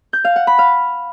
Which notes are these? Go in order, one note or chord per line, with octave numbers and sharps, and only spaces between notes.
G6
F5
F#5
B5
F5